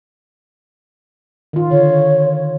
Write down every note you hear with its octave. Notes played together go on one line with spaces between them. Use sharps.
D#3 F4
D3 C#5